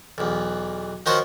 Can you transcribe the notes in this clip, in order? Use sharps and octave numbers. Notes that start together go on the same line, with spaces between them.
B1 E2
D#3 F3 F#4 C5 C#5 F#5